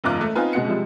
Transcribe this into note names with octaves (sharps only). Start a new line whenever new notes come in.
F#1 E2 G#2 F4 D6 F#6
A3
B3 C4 D#4 F4 B4 G#5
C#2 B2 G#3 F#5 C#7
C3 F3 G3 G#3